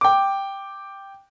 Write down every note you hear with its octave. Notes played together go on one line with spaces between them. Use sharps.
G5 D6